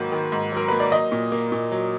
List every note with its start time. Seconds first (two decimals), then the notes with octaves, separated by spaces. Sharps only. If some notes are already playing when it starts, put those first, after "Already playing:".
Already playing: G#2 D#3 F#3 A#3 B4
0.12 D#3
0.32 G#2
0.52 F#3 A#4
0.68 A#3 B4
0.80 D5
0.92 F#3 D#5
1.12 A#2
1.32 A#3
1.52 A#2
1.72 F#3